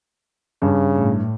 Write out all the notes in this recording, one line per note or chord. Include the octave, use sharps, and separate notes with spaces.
G2 C#3
A2